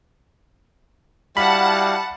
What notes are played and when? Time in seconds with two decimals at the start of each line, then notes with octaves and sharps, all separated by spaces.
1.37 G3 E4 F#4 F5 F#5 A5 B5